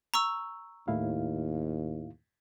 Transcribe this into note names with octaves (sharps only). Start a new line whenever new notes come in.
A#5 C#6 E6
D#2 A2 E4 F5